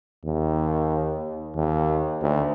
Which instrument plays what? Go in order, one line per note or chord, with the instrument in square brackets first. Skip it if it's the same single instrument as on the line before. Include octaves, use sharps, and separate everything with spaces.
[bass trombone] D#2
D#2
D2